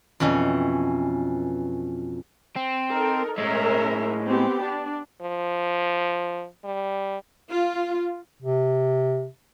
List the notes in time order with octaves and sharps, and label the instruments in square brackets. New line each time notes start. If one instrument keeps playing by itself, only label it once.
[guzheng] F2 B2 E3 C#4
[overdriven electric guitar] C4
[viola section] D#4 A4 A#4
[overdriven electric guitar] A2 G#3 [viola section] C#4 A#4 E5
[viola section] B3 C4 G4
D4
[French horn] F3
G3
[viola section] F4
[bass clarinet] C3